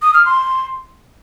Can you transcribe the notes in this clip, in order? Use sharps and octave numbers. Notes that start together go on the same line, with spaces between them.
D#6
F6
C6